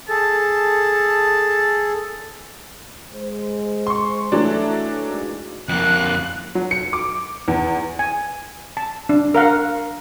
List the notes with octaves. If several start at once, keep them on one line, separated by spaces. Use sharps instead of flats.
G#4 A4 A5
G#3 C5
C6 C#6
E3 F#3 A3 D4
G#3 A#3 D#4
F2 A#3 F#6
F#3
C#7
D6
E2
G#5
A5
D4
A#4 F5 F#5